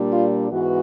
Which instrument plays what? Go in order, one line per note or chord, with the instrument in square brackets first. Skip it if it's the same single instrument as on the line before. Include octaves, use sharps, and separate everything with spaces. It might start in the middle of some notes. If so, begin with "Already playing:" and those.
Already playing: [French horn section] A#2 G3 A#3 D4
F4
G#2 E3 B3 F#4